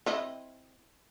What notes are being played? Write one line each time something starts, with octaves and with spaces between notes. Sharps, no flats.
C4 E4 D#5